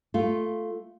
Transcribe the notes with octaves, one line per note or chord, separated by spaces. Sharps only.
A3 F4